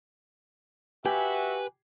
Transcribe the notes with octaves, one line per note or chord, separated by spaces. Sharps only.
F#4 G4 B4 E5 G#5